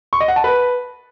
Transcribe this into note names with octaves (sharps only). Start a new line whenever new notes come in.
C#6
D#5
F#5
A5
B4